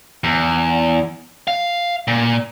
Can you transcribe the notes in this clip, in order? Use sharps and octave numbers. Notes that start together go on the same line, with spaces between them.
E2
F5
A#2